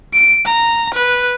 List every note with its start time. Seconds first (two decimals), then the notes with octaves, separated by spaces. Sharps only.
0.14 D7
0.46 A#5
0.94 B4